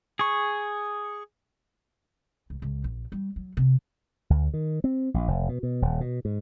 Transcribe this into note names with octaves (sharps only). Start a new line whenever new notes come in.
G#4 C#6
C#2
C#2
A#1
G3
F#3
C3
D2
D#3
C4
A#1
F1
B2
B2
D#1
B2
G#2